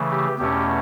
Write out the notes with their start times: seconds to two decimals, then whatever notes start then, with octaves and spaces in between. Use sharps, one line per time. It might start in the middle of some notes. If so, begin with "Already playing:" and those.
Already playing: C#3 E3 A3
0.11 G4
0.39 E2 B2 A3 C#4 G4